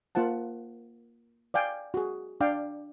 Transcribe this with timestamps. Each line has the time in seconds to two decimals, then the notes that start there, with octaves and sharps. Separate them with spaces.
0.15 A#3 F4 C5 F#5 A5
1.54 D5 F5 G5 G#5
1.94 F#4 G#4
2.41 D4 D5 F5 G5